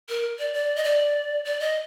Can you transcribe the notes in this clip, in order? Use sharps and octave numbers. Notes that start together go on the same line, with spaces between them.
A#4
D5
D5
D#5
D5
D5
D#5